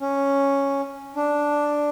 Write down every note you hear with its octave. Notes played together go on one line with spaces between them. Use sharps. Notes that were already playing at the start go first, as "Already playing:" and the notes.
C#4
D4